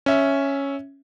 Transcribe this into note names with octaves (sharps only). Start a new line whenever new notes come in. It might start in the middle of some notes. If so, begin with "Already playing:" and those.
C#4 E5